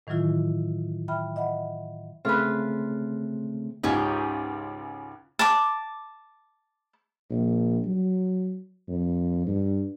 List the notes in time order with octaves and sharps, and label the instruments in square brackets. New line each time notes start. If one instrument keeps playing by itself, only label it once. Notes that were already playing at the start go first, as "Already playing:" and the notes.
[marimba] A2 D#3 E3 F#3 E4 F4
E5 G5 B5 F6
D#5 E5 F#5 B5
[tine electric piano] C#3 A3 C4 [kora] F4 B4
[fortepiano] C#2 G#2 F4 [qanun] D#4 G4 C#5
[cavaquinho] A5 D6
[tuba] A#1
F#3
F2
G2